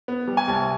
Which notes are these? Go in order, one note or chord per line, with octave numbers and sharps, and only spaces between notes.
B3
G3
G#5
C2 A5